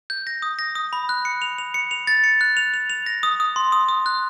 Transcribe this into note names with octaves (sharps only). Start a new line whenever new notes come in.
G6
A#6
D#6
A#6
D#6
B5
F#6
C#7
F7
F7
C#7
F7
A6
C#7
F#6
F7
F7
F7
A#6
D#6
D#6
C6
D#6
D#6
F#6